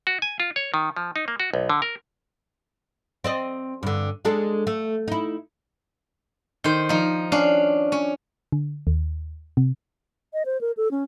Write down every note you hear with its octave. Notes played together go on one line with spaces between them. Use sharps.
F#4
G#5
F4
C#5
D#3
F3
D#4
A#3
F#4
B1
D3
A#4
C4 D5 D#5
G2 D3
G#3 D4 A4
A3
D#4 E4
D#3 C5
F3 D#4
C#4 D4 F5
C#4
D3
D#2
C3
D#5
C5
A#4
A4
C#4